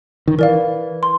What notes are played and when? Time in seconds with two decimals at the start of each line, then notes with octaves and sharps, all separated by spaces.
0.28 D#3
0.39 E3 A#4 D5 F5
1.03 C6